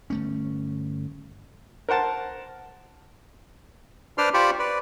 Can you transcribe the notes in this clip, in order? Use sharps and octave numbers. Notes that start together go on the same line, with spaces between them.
G1 A3 C#4
A#4 C5 F#5 A5
D4 B4 C5 D5 C6 F6
F4 G4 C5 D5 B5 C#6
B4 D5